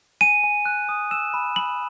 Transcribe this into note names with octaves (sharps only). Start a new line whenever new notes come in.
G#5 D#7
G#5
F#6
D#6
E6 E7
B5
B5 F#7